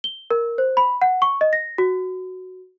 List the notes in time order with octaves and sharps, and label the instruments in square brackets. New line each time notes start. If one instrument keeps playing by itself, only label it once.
[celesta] G7
A#4
C5
B5
F#5
C#6
D#5
A#6
F#4